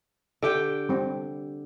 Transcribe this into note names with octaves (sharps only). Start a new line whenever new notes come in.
D3 G4 G5
G3 C4 D4